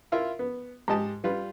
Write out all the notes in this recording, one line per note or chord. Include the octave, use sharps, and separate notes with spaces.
E4 F4 A#4 E5
B3
G#2 G4 D#5 A5
G3 F4 B4